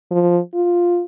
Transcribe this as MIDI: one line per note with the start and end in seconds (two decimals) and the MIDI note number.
0.11 0.38 53
0.54 1.03 65